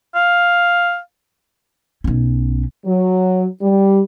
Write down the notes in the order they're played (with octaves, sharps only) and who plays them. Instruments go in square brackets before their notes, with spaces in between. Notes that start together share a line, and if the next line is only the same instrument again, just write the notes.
[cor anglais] F5
[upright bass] B1 C#4
[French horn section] F#3
G3